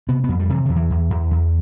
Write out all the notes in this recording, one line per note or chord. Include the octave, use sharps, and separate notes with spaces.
C3 B3
F2 B3
G3
C3 E3
E2 D3
E3
E2
E2
E2